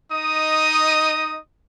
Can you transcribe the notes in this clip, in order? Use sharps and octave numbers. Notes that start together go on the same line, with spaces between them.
D#4 D#5 D#6